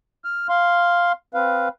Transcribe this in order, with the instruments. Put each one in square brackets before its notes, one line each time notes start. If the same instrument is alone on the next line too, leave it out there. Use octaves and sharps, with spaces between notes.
[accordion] F6
F5 C6
C4 B4 F5